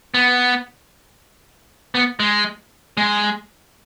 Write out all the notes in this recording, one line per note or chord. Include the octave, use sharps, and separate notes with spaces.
B3
B3
G#3
G#3